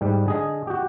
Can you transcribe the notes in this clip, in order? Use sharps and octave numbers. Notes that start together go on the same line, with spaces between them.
G#2 G3
D3 G#4 D#5
F#4 G4